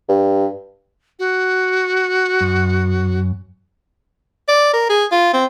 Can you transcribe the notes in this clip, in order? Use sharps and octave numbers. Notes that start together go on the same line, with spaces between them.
G2
F#4
F#2
D5
A#4
G#4
F4
C4